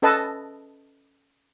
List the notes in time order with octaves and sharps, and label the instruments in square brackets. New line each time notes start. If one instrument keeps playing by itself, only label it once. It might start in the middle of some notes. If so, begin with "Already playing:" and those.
[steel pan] C#4 A4 B4 D#5 A5